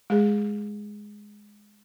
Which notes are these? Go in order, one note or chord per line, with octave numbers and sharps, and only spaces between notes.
G#3 G#4